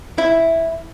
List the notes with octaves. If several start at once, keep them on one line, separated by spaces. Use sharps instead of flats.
E4